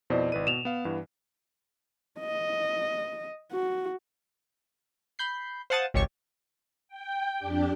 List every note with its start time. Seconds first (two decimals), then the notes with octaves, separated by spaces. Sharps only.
0.10 F2 B2 E4 C5 D5 D#5
0.32 G#1 B4 D#7
0.47 B2 E7 F7
0.65 B3 F5
0.85 G2 E3 B3
2.20 D#5
3.52 F#4
5.19 B5 G6 C7
5.70 C5 F5 F#5 A5 D#6 A6
5.94 G#1 C#2 G4 C#5 A5 C#6
6.88 G5
7.38 F2 D4 G4